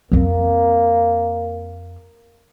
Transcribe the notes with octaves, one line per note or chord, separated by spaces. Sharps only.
F2 A#3 C4